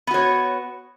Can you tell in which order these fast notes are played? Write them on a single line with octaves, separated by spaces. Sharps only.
B3 F#4 C#5